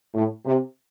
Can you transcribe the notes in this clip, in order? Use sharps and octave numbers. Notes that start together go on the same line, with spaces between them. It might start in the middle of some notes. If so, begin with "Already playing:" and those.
A2
C3